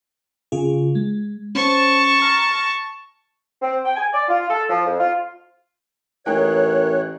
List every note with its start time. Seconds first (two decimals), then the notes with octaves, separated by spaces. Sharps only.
0.52 C#3 F4 G#4
0.95 G#3
1.55 C#4 C5 A5 C#6
2.20 A#5 F6 A#6
3.61 C4
3.84 G5
3.96 G#5
4.12 D5
4.29 F4
4.49 A4
4.70 F3
4.86 F2
5.00 F4
6.26 A1 D#4 G#4 A#4 C#5 G5 F#6